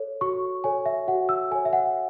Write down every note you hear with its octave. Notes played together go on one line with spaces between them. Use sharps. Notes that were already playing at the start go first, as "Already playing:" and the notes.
Already playing: A4 C#5
F#4 C#6
A4 C#5 G#5
E5
F#4 F#5
E6
A4 C#5 G#5
E5
F#5